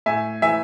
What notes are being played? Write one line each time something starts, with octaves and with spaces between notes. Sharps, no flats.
A2 E5 G#5
E3 E5 G#5